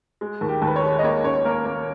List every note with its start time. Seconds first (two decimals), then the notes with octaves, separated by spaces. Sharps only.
0.21 G#3
0.41 D#2
0.48 G4
0.62 D#2
0.67 B4
0.76 C#5
0.83 G#3
0.99 D#5
1.03 A#3 C#5
1.24 C#2 C#5
1.45 A#3 A#4
1.65 A#3